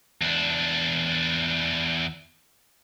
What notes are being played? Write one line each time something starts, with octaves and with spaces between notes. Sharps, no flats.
E2 D4